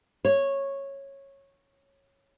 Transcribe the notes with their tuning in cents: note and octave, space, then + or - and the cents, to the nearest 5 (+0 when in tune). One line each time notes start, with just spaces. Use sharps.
C#5 -10